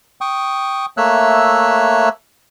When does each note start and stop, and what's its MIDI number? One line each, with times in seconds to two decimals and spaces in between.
0.21 0.86 79
0.21 0.86 85
0.21 0.86 87
0.97 2.09 57
0.97 2.09 58
0.97 2.09 73
0.97 2.09 76
0.97 2.09 88
0.97 2.09 90